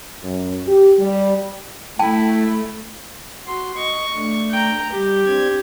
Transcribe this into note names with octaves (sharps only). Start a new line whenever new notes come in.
F#2
G4
G3
A3 E4 G5 A5
F#4 C6
D#5 C#6
A3 D4
G5 A#5
G3 G4
C4 D4 G#6